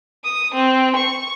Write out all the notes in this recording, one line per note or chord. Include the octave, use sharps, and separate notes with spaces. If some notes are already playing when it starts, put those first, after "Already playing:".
D#6
C4
C#6